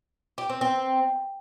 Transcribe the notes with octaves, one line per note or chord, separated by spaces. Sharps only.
G4
C4
C4